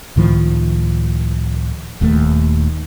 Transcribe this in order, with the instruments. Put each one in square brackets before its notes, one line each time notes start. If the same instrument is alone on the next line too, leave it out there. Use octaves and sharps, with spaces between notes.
[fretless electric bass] C#2 A2 D#3 F3
D#1 D#2 A3